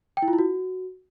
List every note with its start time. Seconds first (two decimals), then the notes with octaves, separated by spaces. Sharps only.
0.17 G5
0.22 E4
0.28 F4
0.33 E4
0.39 F#4